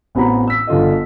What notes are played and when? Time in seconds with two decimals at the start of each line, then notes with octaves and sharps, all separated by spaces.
0.15 A1 B3 C4 F#4 A#5 B5
0.48 E6 B6
0.67 G1 D3 F4 A4 D#5